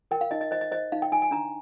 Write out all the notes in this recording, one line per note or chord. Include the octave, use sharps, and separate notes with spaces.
A#4 G5
F5
D#4 D#5
D#5
C5 D#5
D#5
C5 D#5
D#4 F5
G5
D#4 G#5
G#5
D4 A#5